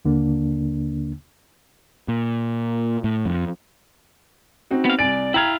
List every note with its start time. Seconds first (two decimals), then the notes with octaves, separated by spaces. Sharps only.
0.05 D#2 D3 A#3 D4
2.08 A#2
3.04 A2
3.25 F2
4.71 C4 D#4 F#4
4.85 B3 F5
4.99 C2 D5 G#5 D7
5.34 E4 F5 G5 A#5 G#6